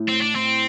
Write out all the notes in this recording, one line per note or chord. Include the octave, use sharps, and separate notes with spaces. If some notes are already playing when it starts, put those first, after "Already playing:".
Already playing: A2
C4
D4
C4